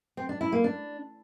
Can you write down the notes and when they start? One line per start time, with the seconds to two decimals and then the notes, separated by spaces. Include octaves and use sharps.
0.17 C4
0.29 D4
0.41 E4
0.52 A#3
0.64 D4